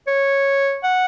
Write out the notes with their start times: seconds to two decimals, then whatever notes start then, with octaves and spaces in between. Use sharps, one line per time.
0.07 C#5
0.84 F#5